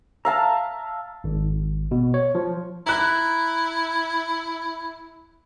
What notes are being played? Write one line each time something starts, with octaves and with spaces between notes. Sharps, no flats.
E5 F5 A5 A#5
G#1
B2
C#5
F3
E4 A#5 F#6